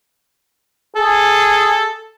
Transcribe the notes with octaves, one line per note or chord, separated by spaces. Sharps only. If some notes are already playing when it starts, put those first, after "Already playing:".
G#4 A4